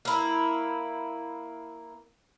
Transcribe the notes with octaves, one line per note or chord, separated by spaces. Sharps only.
A#3 E4